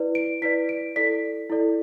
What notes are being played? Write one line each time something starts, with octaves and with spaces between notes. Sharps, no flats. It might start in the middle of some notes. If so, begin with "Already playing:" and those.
Already playing: E4 B4 D5
D7
E4 B4 D5 B6
D7
E4 A4 D5 B6
E4 A4 D5